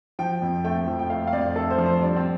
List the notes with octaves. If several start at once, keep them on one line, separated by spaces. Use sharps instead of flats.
F3 G5
F2
A3 G5
F3
G5
A3 F5
F5
F2 D5
A3 A4
C5
F3
C5
G3 D4
C4